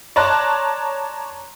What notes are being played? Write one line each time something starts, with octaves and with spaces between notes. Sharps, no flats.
C#5 D5 A5 A#5 C6 F#6